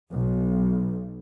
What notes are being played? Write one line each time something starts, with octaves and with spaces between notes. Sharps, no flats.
B1